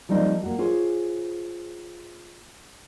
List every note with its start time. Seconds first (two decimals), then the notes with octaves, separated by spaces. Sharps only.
0.09 F3 G3 A#3 C4 D#4 C5
0.43 A#3 F#4
0.59 F4 G#4 C5 C#5